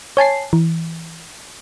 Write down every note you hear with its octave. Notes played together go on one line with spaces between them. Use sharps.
C#5 G#5 A5 C7
E3